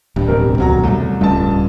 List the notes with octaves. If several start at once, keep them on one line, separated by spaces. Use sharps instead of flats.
D1 G2 G3
E2 B2 G3 C4 A#4
D#1 C#2 D3 F#3 A#5
C2 G3 A3
D1 C#2 G2 G3 A5